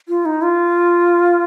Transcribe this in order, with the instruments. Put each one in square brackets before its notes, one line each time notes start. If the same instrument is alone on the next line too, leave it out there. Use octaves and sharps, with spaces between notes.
[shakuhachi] F4
D#4
F4